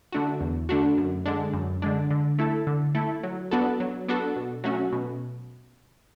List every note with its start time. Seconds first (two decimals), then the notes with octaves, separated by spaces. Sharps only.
0.12 D3 A3 D4 F#4
0.41 E2
0.69 D3 A3 D4 F#4
0.98 F#2
1.26 D3 G#3 D4
1.53 F#2
1.82 D3 G#3 D4
2.11 D3
2.39 A3 E4 A4
2.67 D3
2.95 A3 E4 A4
3.23 F#3
3.51 B3 D4 F#4 A4
3.80 F#3
4.08 B3 D4 F#4 A4
4.36 B2
4.64 F#3 A3 C#4 F#4
4.93 B2